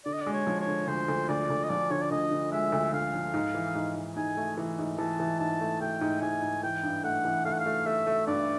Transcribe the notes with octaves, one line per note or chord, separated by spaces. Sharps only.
D3 D5
D#5
D5
G#3
C#5
F3
C#5
D3
D2 C5
D2
D2 D5
D2
D#5
F3 D5
D3 C#5
D5
D2 D#5
D3
G#3 E5
D2
D2 F5
F3
G#2
E3
G#2
G#2
G#2 G#5
A3
E3
G#2
E3 A5
E3
G#2 A5
A3
A3 G5
G#2
G#2 G#5
G#2
E3 G5
G2
A3 F#5
E3
A3 F5
F#5
F5
A3
A3 E5
A3
G2 D5